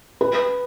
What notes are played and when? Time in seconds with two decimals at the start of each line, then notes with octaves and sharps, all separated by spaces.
0.21 B4